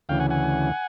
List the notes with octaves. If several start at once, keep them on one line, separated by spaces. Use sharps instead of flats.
D2 C#3 E3 F5 G5
F#5 G#5
F#5 G#5